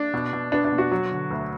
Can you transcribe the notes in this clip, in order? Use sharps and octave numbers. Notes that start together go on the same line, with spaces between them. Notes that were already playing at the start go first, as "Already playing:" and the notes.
Already playing: D4
B2
B2
B3 D4
D4
B2
F#4
F#3
D3
D2